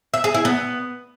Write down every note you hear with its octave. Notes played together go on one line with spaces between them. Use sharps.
E5
G#4
E4
B3